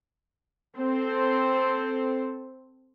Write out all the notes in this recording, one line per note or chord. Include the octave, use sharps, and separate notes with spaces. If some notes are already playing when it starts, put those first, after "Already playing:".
C4 A4 C5